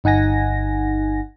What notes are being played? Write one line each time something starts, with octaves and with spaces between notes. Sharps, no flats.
G1 D#4 F#5 G#5 A#6